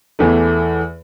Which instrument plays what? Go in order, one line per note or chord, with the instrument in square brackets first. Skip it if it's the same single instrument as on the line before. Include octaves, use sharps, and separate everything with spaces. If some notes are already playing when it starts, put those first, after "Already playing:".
[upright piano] E2 E3 A3